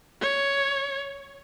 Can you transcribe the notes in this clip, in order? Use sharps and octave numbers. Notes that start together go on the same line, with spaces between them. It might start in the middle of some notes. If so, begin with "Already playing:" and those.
C#5